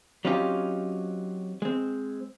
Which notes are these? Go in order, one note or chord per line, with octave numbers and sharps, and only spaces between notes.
F#3 C4 C#4 D#4 F4 G4
G#3 C4